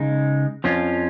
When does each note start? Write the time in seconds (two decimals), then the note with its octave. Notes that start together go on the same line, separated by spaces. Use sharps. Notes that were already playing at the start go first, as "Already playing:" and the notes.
Already playing: C#3 G#3 D#4
0.64 F2 F3 C#4 F4